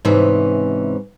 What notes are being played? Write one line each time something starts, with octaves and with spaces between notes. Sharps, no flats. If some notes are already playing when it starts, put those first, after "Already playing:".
G#2 C3 E3 C#4